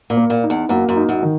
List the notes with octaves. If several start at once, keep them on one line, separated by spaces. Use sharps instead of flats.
A#2
A#3
A#2
D#4
E2
F#2 A#3
F#2
D#4
F#2
D#3